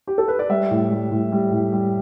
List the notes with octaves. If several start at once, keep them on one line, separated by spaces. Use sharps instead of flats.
G4
A4
B4
D5
G3 E5
A2
G3
A2
G3
A2
G3